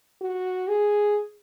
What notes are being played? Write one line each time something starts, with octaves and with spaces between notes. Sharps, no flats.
F#4
G#4